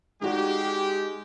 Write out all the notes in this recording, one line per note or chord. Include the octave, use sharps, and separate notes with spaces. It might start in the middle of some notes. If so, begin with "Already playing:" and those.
G#3 D#4 F#4 G4 D5